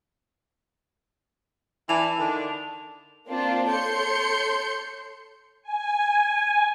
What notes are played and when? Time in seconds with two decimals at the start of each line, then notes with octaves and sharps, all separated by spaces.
1.89 E3 D4 E4 A5 F7
2.19 D3 D#3 D4
3.28 A#3 C4 D4 F4 C5 A5
3.68 A4 C#5 C6 G6 C#7
5.62 G#5